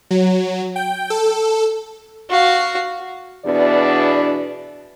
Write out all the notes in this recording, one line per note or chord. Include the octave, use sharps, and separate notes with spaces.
F#3
G5
A4
F#4 F5
E2 B2 D4 D5